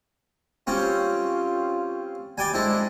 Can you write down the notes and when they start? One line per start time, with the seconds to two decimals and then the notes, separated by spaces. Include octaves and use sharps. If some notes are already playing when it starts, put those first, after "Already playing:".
0.67 G3 C4 C#4 F4
2.38 G3 D5 G5 G#5
2.54 G#3 C4 D4 E4